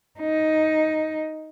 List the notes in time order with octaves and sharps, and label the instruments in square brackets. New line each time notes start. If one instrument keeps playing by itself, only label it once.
[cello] D#4